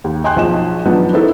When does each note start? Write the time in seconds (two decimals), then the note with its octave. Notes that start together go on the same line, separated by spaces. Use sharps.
0.04 D#2
0.24 D#5 G5 G#5 C6 F#6
0.36 B1 F3 G#4 D#5 E7
0.85 D#3 F3 F#3 B3 D4 D#4
1.13 E3 B3 C4 D#4 E4 A4